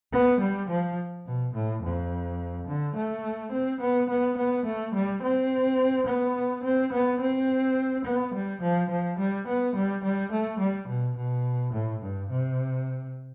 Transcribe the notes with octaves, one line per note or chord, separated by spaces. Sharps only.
B3
G3
F3
B2
A2
F2
D3
A3
C4
B3
B3
B3
A3
G3
C4
B3
C4
B3
C4
B3
G3
F3
F3
G3
B3
G3
G3
A3
G3
B2
B2
A2
G2
C3